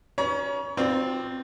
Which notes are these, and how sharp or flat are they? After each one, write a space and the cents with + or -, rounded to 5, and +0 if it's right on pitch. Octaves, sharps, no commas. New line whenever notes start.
C#4 +15 C#5 +30 A#5 +45
C4 -5 F4 +15 D5 +25